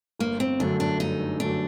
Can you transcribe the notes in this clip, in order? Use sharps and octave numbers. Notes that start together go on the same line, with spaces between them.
G1 A#3
C4
F#2 D3 F#3 A3 D4
D4
G1 D#4
F#2 D3 F#3 A3 D4